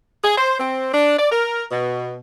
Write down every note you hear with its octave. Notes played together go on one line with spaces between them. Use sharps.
G#4
C5
C4
D4
D5
A#4
B2